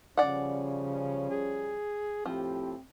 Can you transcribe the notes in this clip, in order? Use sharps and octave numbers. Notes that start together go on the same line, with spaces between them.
C#3 F3 G3 C#4 D5 F#5
G#4
A2 F3 C4 E4 G4